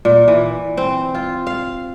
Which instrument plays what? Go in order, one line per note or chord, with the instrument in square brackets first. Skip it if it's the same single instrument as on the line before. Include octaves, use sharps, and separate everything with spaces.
[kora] A#2
E3
C4
F4
F5